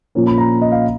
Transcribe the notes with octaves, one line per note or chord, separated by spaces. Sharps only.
A#2 F3 A#3 C#4
B5
A#5
D#5
F5